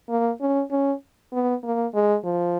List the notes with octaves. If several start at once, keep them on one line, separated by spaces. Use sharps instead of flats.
A#3
C#4
C#4
B3
A#3
G#3
F3